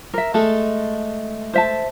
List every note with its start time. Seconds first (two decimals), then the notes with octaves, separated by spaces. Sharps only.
0.14 A#4 E5
0.34 G#3 A3 A4
1.54 C5 E5 A5